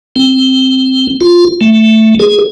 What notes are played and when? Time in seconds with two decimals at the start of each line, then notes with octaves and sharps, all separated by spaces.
0.16 C4
1.21 F4
1.61 A3
2.20 G#4